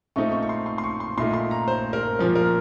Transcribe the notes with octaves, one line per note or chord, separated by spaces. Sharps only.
A#2 A3 C4 D#4 C#6
C#6
C#6
C6
C6
C6
C#6
C6
A#2 A3 D#4 C6
C6
A#5
C5
A#4
A#2 F3 A#3
A#4